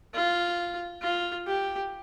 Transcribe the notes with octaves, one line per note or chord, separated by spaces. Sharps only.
F4
F4
G4